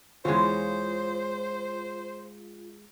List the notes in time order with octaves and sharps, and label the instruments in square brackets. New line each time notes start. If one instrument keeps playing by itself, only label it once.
[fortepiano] E2 E3 [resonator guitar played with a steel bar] G#3 C#5 [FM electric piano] F4 [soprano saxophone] C5